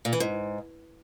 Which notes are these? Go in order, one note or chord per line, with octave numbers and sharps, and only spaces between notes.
A#2
E3
G#2